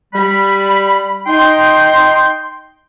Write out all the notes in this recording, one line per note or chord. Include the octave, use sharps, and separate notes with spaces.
G3 B5
D#4 G5 C6